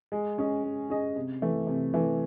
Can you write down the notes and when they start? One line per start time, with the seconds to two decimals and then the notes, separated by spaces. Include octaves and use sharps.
0.12 G#3
0.38 C#4 G#4 D#5
0.64 G#3
0.90 C#4 G#4 D#5
1.16 C3
1.42 E3 A3
1.67 C3
1.94 E3 A3